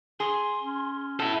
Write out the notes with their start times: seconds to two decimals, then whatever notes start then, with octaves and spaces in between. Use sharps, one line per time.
0.20 G#4 C6
0.62 C#4
1.20 B2 E4 A4